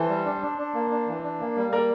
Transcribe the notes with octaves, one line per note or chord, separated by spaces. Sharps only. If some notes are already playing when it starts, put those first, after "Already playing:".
Already playing: E3 A4 C5
G3
D4
D4
D4
A#3
D4
E3
D4
A#3
G3
A#3 A#4 D5